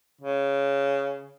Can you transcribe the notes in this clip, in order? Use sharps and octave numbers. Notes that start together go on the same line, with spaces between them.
C#3